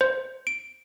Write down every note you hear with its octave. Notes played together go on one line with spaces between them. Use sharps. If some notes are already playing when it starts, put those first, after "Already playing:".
C5
D7